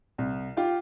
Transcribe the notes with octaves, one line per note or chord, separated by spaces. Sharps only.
C2
F4 G4